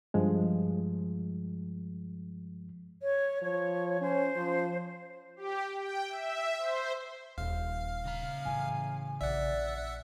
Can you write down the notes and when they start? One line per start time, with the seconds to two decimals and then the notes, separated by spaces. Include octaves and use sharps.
0.14 G2 F3 G#3
3.02 C#5
3.42 F3 C#5
4.01 C#4 C5
4.36 F3
5.36 G4
5.76 G5
6.09 E5
6.58 C5
7.38 D#1 F5
8.05 C#3 A#5
8.45 A2 E3 G#5
9.21 A#1 D5 E5 F#5